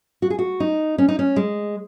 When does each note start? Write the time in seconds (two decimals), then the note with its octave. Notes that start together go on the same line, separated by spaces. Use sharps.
0.22 F#4
0.30 G#4
0.39 F#4
0.60 D#4
0.98 C#4
1.08 D#4
1.19 C#4
1.36 G#3